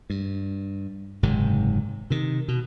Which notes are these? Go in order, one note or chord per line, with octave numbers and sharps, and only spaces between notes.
G2
F#1 G#2 C3 D#3
C3 D#3
B2